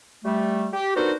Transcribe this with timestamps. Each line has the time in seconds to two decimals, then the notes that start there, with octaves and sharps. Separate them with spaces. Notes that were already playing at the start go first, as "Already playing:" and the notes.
0.25 G3 A3
0.73 G4
0.96 B3 D4 D#4 F#4 A#4 C5